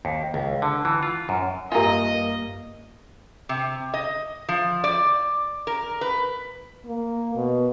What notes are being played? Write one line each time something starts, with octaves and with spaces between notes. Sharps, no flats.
D#2
C#2
D3
E3
F4
F#2
G2 A#3 F4 G4 A#4 D#5 E5 G#5
C3
D#5
F3
D5
A#4
B4
A#3
B2